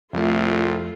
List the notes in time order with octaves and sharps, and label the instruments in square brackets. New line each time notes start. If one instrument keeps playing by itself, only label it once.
[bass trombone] C2 [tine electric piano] F2 F3 E5 [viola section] A3 F4